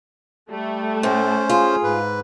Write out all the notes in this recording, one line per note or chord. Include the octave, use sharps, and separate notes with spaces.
G3 A3
A2 C#4 C5
F4 G#4
G#2 B4